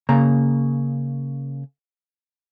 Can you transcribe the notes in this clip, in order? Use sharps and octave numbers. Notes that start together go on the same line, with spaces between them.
C#3 A#3 A#5